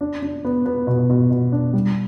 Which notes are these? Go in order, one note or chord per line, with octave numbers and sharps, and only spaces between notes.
D4
D4
B3
B3
B2
B2
B2
D4
G3